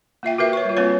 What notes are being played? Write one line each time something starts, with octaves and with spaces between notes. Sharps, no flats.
A#3 F4 E5 G5
F#4 A#4 B4 E5
C#5 C#6
G3 F4
A#3 C4 F4 B4 C#5